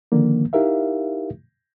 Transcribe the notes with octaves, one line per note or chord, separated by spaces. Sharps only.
D3 D#3 F3 A#3
D#4 E4 G4 A#4 E5 F5